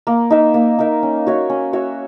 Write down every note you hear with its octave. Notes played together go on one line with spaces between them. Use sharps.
A#3
D#4 A#4 E5
A#3
D#4 A#4 E5
C#4
F#4 C#5 E5
C#4
F#4 C#5 E5